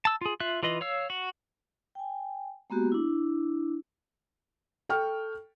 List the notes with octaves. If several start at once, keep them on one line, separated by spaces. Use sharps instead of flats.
A5 E6
F4 G#4
F4 E5 F#6
E3 F4 B4 D#5
C#5 F5 E6
F#4
G5 G#5
G#3 A#3 B3 F#4 G4
D4 E4
A4 G5 C#6 F6